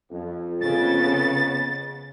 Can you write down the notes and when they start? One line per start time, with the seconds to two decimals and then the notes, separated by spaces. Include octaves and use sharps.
0.11 F2
0.61 C#3 B3 A6